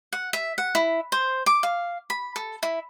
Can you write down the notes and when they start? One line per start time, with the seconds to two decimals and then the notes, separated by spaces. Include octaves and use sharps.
0.13 F#5
0.33 E5
0.58 F#5
0.75 E4
1.12 C5
1.46 D6
1.63 F5
2.10 B5
2.36 A4
2.63 E4